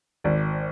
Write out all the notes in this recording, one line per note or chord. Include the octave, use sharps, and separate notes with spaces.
G#1 D5